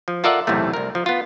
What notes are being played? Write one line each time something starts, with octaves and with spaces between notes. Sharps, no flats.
F3
F4 A4 A#4 D5 E5 F#5
B1 E2 A2 C3 A3
C2 A#4
F3
B3 F4